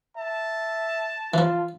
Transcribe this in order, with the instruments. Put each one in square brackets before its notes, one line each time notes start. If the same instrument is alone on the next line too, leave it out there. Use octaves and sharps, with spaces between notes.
[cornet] E5 [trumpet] A5
[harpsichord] E3 F3 [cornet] F4